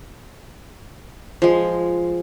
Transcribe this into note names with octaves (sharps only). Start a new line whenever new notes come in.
F3 G#3